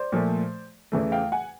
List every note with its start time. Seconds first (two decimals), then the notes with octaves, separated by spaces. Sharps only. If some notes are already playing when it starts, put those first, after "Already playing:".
Already playing: C5 D5
0.12 A#2 F3 A3
0.92 E2 C#3 E3 A3
1.12 F5 G5
1.32 F#5 G#5